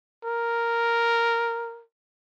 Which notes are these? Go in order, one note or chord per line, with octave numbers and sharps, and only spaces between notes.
A#4